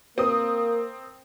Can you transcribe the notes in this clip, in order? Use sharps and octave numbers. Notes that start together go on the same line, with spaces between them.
A#3 C4 A#4 D#6